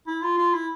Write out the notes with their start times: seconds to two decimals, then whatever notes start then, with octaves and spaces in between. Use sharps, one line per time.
0.07 E4
0.23 F4
0.38 F4
0.54 E4